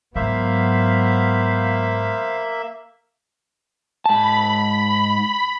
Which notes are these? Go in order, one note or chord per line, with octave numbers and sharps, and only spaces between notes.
G#2 F#3 A#3 B3 C5 E5 F5 B5
G#2 A5 B5